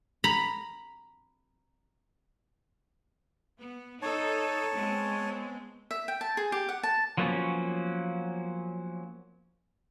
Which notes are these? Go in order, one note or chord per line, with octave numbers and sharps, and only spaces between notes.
A#5 B5
B3
D#4 A4 C#5 A5
G#3 B3 C4
E5
G5
A5
G#4
G4
F#5
A5
F3 F#3 A#3 B3 C#4